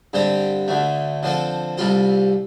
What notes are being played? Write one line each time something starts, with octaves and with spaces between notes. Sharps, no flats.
G2 D3 G3 C4 G4
D2 D3 A3
D3 F3 C4 A4
C2 C3 G3 F4 A4